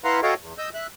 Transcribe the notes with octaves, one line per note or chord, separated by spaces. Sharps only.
E4 B4 F5 F#5 A#5 C6
F#4 A4 C#5 D#5 F5 G5
E2
D#5 E6 G6
E5 F#6